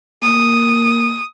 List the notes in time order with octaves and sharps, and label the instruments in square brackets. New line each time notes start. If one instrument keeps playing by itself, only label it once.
[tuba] A#3 [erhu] D#6